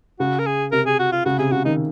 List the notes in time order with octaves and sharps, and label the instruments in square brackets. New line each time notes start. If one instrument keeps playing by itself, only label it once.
[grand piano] C#3 [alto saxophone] F#4
[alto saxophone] A#4
G#4
[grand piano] C3 [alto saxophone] A#4
[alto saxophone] G#4
F#4
F4
[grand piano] C#3 [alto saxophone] F#4
[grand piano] C3 [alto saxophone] G#4
[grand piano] C#3 [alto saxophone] F#4
[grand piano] D#3 [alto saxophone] D#4